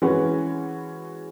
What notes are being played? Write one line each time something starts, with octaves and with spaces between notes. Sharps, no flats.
E3 G#3 C#4 F#4 B4